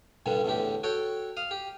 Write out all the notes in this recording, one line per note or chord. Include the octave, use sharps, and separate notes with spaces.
G2 A#2 D3 G3
E2 A2 D3 G4
F#4 A4 C#5 G5
F5 D#6
G4